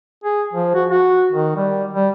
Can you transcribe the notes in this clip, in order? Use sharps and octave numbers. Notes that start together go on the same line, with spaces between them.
G#4
F3
F#4
F#4
D#3
G3
G3